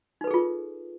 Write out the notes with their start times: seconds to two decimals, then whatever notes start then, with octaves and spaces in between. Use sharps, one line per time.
0.21 D#4
0.24 B4
0.27 A4
0.31 G#4
0.34 F4